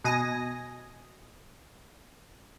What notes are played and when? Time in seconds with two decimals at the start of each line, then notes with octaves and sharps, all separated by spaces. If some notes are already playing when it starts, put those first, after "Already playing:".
0.04 B2 D#5 G#5 A#6